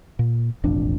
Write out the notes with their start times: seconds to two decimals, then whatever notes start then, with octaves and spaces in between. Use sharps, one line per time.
0.19 A#2
0.64 E1 A1 F2 D4